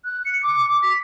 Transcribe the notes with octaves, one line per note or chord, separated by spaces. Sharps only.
F#6
C#7
D6
D6
B6